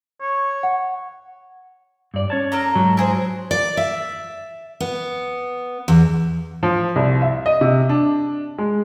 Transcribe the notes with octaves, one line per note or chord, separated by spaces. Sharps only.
C#5
F#5
G2 D5
C#4 C#5 A5
A#3 A4 A#5
G#2 F#3
E4 G#4 C5
D5
E5
B3
E2
F3
C2
E5
D#5
C3
D4
G#3